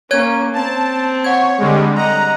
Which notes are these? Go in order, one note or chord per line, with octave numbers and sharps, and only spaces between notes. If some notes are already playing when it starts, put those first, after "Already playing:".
A#3 C#4 C#5 G#6
C4 A5
C#5 F#5 G#6
D3 G3 G#3
D#5 F#5 A#5